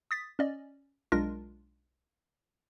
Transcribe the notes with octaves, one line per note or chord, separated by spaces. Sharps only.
D#6 A6 B6
C#4 D5 D#5
B1 G#3 D4 F4 A#4 A#6